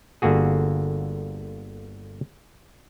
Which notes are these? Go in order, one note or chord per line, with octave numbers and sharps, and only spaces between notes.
G1 D3 A#3 F#4 G#4